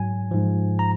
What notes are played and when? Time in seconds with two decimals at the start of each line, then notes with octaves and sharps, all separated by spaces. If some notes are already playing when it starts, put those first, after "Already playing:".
Already playing: G#2 F#3 G#5
0.31 G#2 F3
0.79 A#5